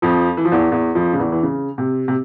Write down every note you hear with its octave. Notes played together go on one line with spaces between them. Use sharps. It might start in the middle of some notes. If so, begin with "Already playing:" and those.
F2 F3
E3
F3
E2 E3
E2 E3
F2 F3
C#3
E2 E3
E3
C#3
C3
C3